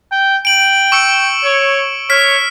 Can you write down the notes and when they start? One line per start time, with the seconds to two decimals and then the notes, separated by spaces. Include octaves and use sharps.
0.12 G5
0.45 G5 D7 F#7
0.92 C#6 E6 C#7
1.44 C#5
2.10 C#5 F6 B6